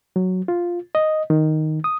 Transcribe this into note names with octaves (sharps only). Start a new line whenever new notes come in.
F#3
F4
D#5
D#3
D#6